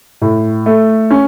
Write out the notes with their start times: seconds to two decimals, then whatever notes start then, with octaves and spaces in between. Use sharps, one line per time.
0.22 A2
0.66 A3
1.10 C#4